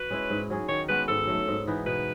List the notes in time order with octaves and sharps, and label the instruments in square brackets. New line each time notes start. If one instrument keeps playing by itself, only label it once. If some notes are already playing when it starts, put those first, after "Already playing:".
Already playing: [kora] F#4 [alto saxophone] B4
[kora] G#3 C#4 E4
G#2
F#3 C#4 G#4
[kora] D#3 [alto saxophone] C#5
[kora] G#3 B3 F#4 [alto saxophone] B4
[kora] G#2 [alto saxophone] A4
[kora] F#3 A3
G#2
E3 B3 D#4
[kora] B2 [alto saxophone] B4